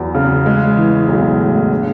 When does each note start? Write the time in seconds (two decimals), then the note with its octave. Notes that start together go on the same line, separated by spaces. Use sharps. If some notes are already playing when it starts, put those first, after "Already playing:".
Already playing: E2 F#3 B3
0.15 C#3
0.46 G#3
0.77 E3
1.08 B1
1.39 A2
1.71 D4